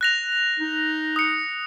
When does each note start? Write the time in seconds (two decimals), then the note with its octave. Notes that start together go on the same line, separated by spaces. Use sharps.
0.01 F#6 A#6 F7
0.60 D#4
1.16 D#6 C#7